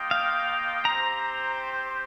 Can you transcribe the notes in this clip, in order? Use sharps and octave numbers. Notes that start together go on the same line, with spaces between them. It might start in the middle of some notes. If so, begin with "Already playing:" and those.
Already playing: A#3 F4 D#5 G5
F5
C4 G4 C5 A#5